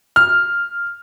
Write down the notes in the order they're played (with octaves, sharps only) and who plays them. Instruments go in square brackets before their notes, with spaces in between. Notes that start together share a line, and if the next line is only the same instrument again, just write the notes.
[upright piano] F6